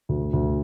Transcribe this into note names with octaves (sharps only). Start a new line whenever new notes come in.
D2
D2